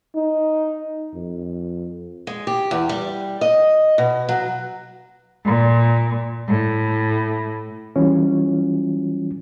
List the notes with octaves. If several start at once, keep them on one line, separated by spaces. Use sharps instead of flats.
D#4
F2
G#3
G4
E2
G3
D#5
B2
F#3
A#2
A2
E3 F#3 G3 C#4 F4